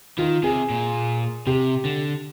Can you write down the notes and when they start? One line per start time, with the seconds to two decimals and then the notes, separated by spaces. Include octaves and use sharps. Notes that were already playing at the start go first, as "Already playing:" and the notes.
0.18 D#3 F4
0.43 C3 G#4
0.70 A#2
1.47 C3 G4
1.85 D3